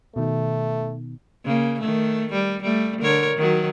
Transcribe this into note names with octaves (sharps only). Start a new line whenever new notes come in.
B2 D#3 A3
C#3 A#3
D#3 A3
G3
G3 A3
D3 A#4 C#5
D#3 F#3